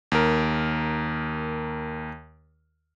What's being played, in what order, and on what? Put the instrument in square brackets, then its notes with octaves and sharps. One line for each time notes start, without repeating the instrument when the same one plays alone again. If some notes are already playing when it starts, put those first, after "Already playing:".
[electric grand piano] D#2 A#4